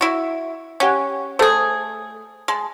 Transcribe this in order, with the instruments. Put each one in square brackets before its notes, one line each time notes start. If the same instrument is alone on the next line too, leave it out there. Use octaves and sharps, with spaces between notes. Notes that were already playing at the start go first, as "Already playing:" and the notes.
[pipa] E4 F#4
[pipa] C#4 [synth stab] G4 F#5 G#5
[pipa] A3 G#4 [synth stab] A4 C5
[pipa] G#3 [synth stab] A5